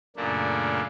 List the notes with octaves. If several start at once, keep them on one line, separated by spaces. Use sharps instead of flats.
F#2 A#2 C#3 A3 A#3 D4